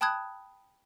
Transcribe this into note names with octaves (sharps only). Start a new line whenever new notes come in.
G5 A5 B5 D#6 F#6 G#6